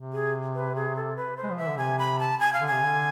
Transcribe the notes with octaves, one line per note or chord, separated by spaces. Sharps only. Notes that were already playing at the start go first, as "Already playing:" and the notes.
Already playing: C3
G#4
B4
G#4
A4
B4
C5
G#3
F3
E3 E5
D3
C3 G#5
B5
A5
G#5
F5
D3
G#5
C3
D3